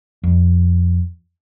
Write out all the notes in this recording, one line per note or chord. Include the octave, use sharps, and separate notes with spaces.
F2